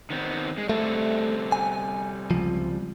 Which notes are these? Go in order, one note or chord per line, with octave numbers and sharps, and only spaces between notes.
D#3 B3 C4
G#3
G3 A3 C4 A4
G#5
C#2 F3